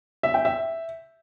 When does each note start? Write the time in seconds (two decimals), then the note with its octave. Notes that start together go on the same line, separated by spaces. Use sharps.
0.23 E5
0.34 G5
0.45 E5